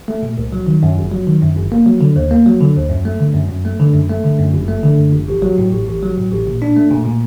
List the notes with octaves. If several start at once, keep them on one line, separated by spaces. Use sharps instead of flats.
A3
A#2
C2
F#3
D#3
F#2
G1
F#3
D#3
F#2
G1
A#3
F#3
D3
D#2
A#3
F#3
D3
D#2
F#2
A3
D3
F#2
F#2
A3
D3
F#2
A3
D3
F#2
G1
A3
D3
F#2
G1
A1
F#3
A2
A1
A1
F#3
A2
A1
A#2
D4
A3
A#2
A#2